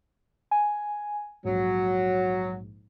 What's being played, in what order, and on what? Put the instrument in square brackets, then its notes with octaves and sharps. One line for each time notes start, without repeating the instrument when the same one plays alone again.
[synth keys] G#5
[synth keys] A#1 G#2 [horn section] F#3